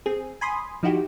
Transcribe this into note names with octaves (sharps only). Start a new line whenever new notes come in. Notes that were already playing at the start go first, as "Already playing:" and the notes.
C4 G#4
G#5 B5 C6 D#6
F3 D#4 E4 F#4 G4